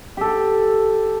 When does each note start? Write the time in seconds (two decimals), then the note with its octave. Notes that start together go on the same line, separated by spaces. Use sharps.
0.17 G4 A4